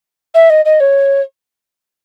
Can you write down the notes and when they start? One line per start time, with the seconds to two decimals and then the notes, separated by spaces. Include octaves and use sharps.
0.34 E5
0.50 D#5
0.65 D#5
0.80 C#5